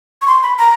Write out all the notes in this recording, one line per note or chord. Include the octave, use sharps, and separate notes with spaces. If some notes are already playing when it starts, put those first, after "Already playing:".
C#6
C6
B5
A#5